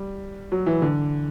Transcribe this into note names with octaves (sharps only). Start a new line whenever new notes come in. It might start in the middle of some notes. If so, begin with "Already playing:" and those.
Already playing: G3
F#3
E3
D3